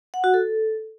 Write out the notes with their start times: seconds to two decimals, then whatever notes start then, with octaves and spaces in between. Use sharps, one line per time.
0.14 F#5
0.24 F#4
0.34 A4